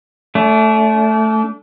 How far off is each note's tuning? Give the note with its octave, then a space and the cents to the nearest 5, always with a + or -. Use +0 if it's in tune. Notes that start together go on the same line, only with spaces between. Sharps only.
A3 +0 D4 -35